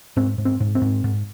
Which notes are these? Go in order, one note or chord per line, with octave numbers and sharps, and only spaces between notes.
G#2 C4
G#2
C4
G#2
C4
G#2
G#2